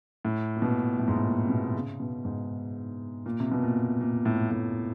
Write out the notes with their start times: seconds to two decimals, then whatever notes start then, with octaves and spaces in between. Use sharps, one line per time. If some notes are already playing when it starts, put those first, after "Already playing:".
0.25 A2
0.56 A#2
0.62 B2
0.99 A2
1.08 G#2
1.16 A2
1.24 A#2
1.46 C3
1.50 B2
1.75 C#3
2.00 B2
2.25 G#2
3.26 A#2
3.40 C3
3.52 B2
3.63 A#2
4.01 A#2
4.26 A2
4.51 A2